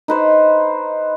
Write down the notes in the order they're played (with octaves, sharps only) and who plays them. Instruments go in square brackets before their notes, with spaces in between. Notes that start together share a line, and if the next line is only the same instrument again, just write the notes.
[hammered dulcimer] D#4 B4 C5